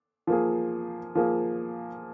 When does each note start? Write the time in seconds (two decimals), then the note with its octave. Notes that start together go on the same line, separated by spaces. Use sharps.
0.27 F3 A#3 G#4
1.15 F3 A#3 G#4